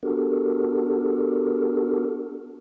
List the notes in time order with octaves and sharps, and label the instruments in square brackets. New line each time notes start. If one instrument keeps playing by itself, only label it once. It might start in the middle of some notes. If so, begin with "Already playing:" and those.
[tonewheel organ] B3 D4 F#4 G4 A4 A#4